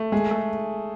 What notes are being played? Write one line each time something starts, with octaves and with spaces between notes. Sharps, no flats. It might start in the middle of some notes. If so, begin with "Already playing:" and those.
Already playing: A3
G#3 G#4
A3